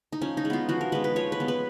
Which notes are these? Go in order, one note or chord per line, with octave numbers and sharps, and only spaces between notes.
D#4
F3 C#4
D#4
G#3
B3 F4
F3 F#4
A#4
G#3 B3 B4
B4
F3 C#5
B4
G#3 B3
B4